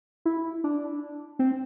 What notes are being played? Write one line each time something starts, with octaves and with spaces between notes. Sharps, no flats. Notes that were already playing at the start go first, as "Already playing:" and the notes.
E4
D4
C4